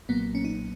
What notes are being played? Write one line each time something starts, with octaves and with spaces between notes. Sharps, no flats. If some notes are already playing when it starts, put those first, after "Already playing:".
B1 A#2 F#3 A#3 B3
C#4
D#4